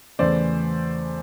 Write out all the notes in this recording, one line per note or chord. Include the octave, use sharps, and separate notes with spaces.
E2 C#3 E3 A3 C5 D5